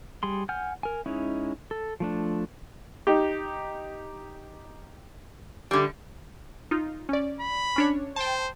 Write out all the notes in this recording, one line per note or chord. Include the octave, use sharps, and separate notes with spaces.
G3 G#4 C6
F#5 G#5 F6 G6
A#4 G#5
G#3 C#4 D#4 E4
A4
F3 A3 D4
D#4 G4
D3 G3
D#4 F4
C#4 D5
B5
C#4 D4 C#5
C5 G5 A5